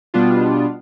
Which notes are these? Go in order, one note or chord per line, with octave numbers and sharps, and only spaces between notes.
B2 G3 B3 D4 F4